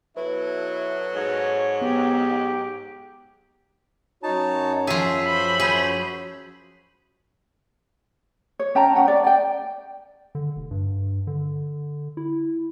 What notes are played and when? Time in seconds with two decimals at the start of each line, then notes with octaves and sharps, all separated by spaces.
0.17 B2 F#3 E4 A4 B4
1.15 G#2 C#5
1.81 F#3 B3 G4
4.23 F#2 D#4 F#4 C#5 A5
4.87 F3 G#4 E5
5.27 C5 B5
5.60 G#4
8.60 C#5
8.75 C#4 G5 A5 A#5
8.95 C#4 D4 F#5 G5
9.08 D5
9.24 D5 G5
10.35 D3
10.56 F1
10.71 G2
11.27 D3
12.17 E4